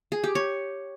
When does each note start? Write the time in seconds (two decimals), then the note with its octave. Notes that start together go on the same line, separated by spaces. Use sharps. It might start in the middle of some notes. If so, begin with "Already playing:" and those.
0.12 G#4
0.24 G4
0.35 C#5